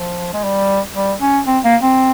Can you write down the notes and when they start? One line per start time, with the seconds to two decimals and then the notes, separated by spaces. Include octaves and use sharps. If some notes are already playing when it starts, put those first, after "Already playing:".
Already playing: F3
0.33 G#3
0.44 G3
0.95 G3
1.21 C#4
1.47 C4
1.64 A#3
1.82 C4